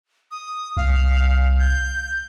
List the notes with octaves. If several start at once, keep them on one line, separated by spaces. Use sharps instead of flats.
D#6
C2 F5
G6